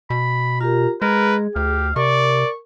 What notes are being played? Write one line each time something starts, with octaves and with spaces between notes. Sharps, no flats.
B2 B5
F4 G4 A#4 A#5
G#3 G#4 A#4 B4
D2 G4 F5
C3 A#4 D5 C#6